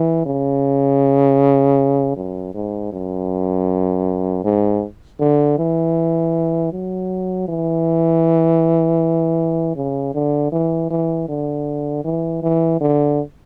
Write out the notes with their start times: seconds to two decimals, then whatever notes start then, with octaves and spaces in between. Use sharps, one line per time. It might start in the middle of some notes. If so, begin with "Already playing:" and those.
Already playing: E3
0.26 C#3
2.16 F#2
2.54 G#2
2.92 F#2
4.44 G#2
5.20 D3
5.58 E3
6.72 F#3
7.48 E3
9.76 C#3
10.14 D3
10.52 E3
10.90 E3
11.28 D3
12.04 E3
12.42 E3
12.80 D3